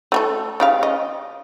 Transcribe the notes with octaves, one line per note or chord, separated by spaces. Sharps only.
A3 G#4 A4
C#3 G4 F5
D#5